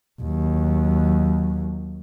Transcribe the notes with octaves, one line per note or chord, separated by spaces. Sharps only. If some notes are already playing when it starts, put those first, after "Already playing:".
D#2 F#3